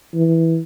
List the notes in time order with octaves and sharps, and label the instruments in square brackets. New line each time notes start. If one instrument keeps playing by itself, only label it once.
[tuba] E3